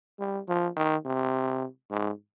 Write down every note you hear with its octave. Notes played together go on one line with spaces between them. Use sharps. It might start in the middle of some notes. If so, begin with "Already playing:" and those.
G3
F3
D#3
C3
G#2